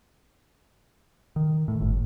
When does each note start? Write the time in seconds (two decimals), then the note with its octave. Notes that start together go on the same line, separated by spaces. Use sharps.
1.36 D#3
1.68 A2
1.81 G1